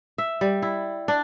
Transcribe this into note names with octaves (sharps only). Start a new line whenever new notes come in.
E5
G3
E4
D4